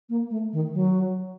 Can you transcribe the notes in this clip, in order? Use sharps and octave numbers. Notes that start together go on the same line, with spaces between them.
A#3
A3
D#3
F#3